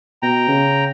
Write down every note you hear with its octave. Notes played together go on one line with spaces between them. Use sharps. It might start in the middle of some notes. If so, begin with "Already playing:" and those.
B2 G5 A#5
C#3